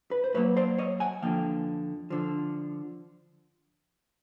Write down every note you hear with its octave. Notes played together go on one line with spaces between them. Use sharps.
B4
C5
A2 F#3 A#3 B4 C#5
C5 D5
C#5 D#5
F#5 G#5
F2 D3 F3 A#3 F5 G5
D3 F3